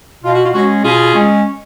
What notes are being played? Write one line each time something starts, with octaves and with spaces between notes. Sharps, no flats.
B2 F4
F#4
F4
G#3 C#4 F#4
B2 F4 G#4
G#3 C#4